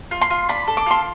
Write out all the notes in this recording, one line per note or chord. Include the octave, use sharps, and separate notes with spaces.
F4
C6
F4
D4 B5
A4
D6
F4 C6